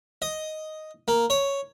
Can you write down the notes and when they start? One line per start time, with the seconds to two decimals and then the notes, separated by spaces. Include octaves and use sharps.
0.22 D#5
1.08 A#3
1.30 C#5